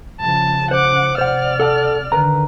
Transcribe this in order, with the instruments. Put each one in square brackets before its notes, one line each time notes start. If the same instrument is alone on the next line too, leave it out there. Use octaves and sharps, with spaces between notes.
[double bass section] C#3 F3 [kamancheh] A5
[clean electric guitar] C5 [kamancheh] F#5 D6
[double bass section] C3 [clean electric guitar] C5 F#5 [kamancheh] D5 F6
[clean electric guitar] A4 F#5 A5
[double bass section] D3 D#3 [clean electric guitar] A#4 B4 A#5